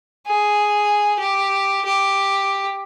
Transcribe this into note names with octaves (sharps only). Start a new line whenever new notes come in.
G#4
G4
G4